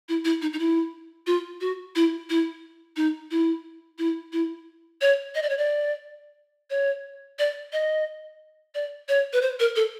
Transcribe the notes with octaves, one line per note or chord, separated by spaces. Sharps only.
E4
E4
D#4
D#4
E4
F4
F#4
E4
E4
D#4
E4
E4
E4
C#5
D#5
D5
C#5
D5
C#5
D5
D#5
D5
C#5
B4
C5
A#4
A4